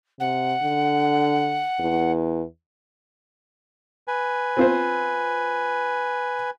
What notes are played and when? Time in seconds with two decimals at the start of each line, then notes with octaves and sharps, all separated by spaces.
0.20 C3 F#5
0.62 D3
1.79 E2
4.08 B4 G#5
4.57 C4 F4 C5